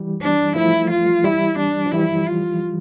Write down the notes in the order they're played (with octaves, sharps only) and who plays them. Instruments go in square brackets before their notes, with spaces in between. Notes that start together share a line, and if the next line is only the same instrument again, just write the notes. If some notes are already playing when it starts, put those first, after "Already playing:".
Already playing: [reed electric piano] E3 G3
[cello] D4
[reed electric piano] F3 A3 [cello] E4
[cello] F4
[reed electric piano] E3 G3 [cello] E4
[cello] D4
[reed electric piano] F3
[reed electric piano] E3 G3 [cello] E4
[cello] F4